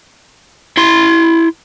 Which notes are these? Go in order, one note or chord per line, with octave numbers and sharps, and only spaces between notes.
E4 C6